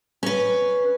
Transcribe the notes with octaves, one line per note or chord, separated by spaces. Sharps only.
C#4 B4